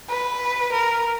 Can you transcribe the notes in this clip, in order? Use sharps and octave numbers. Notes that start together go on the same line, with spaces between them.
B4
A#4